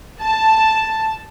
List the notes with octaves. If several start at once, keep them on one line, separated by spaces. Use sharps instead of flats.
A5